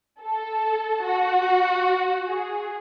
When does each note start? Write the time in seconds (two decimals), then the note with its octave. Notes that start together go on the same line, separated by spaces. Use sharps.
0.23 A4
1.05 F#4
2.28 G#4